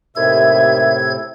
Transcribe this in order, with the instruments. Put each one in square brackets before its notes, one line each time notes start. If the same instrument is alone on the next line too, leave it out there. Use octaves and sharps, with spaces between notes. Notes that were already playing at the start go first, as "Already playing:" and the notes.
[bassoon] D#2 [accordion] A2 C3 [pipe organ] A4 G#6 [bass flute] E5